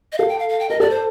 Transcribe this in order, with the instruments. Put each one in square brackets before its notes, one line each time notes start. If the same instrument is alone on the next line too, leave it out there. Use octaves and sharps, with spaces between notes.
[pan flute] D#5
[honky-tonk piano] A4 [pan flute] F5
[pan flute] G5
F5
F5
G5
[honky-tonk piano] A#4 [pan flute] D#5
[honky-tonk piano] A4 [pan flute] D5
[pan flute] C5